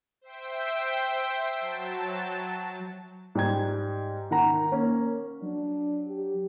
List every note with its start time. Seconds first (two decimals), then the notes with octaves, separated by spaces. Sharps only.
0.21 C5 E5 G5
1.58 F#3 A5
3.35 G#2 G3 G5 G#6
4.31 D#3 F#5 A#5
4.72 A#3 C#4
5.42 F#3 D4
6.08 G4